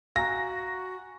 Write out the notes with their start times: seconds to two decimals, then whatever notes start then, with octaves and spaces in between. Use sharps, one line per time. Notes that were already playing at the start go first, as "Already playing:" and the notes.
0.16 F#4 F5 G#5 A#5 A#6